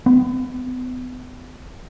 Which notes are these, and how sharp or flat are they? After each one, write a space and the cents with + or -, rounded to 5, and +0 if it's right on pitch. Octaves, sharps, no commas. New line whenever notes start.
B3 +35